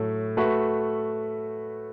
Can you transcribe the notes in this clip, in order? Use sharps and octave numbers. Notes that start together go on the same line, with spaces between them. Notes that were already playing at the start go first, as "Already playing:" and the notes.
Already playing: A2 F#3 A3 A4
A3 F#4 B4 E5